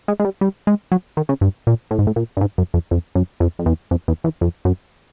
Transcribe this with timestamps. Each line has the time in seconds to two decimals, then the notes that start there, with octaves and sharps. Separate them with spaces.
0.08 G#3
0.20 G#3
0.25 G3
0.41 G3
0.67 G#3
0.92 F#3
1.17 D#3
1.29 C#3
1.41 G2
1.67 A#2
1.91 A2
1.99 G#2
2.07 A2
2.16 A#2
2.37 G2
2.41 G#2
2.58 F#2
2.74 F2
2.91 F2
3.15 F#2
3.40 F2
3.59 F2
3.66 E2
3.91 F2
4.08 E2
4.24 E2
4.41 F2
4.65 F#2